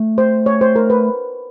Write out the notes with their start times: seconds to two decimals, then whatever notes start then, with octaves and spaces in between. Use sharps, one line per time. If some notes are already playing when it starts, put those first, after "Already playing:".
Already playing: A3
0.18 C5
0.46 C#5
0.61 C5
0.76 A#4
0.90 B4